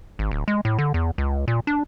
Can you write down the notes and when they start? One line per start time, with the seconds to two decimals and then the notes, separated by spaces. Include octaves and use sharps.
0.19 G#1
0.32 D1
0.48 G#3
0.65 A2
0.78 D3
0.94 E2
1.18 C#2
1.48 A#2
1.67 D4